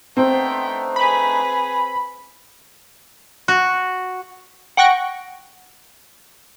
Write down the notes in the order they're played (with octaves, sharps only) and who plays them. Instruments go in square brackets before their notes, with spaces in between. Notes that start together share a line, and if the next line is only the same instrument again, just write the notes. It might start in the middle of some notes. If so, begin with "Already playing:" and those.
[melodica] A3 D4 D#4 [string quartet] B3 G5 [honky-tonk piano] C4
[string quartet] G#4 B4 [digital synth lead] B5
[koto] F#4
[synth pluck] F#5 G5 C#6 F#6 A#6 D7